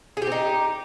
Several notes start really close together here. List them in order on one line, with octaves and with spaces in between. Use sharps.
G#4 G4 C4 D#4